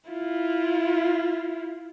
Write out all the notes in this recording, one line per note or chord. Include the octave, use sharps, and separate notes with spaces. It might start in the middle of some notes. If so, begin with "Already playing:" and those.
E4 F4